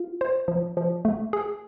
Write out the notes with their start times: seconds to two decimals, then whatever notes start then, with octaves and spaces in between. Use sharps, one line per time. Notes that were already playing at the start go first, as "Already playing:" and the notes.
Already playing: F4
0.21 C5
0.48 F3
0.77 F3
1.05 A3
1.33 G#4